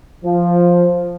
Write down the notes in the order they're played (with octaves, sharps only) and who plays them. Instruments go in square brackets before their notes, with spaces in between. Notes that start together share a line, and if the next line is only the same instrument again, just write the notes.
[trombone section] F3